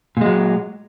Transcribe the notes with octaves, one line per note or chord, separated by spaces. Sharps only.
A#2 F#3 G#3